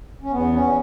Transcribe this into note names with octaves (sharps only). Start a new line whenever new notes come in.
C#4
E2 B3
C#4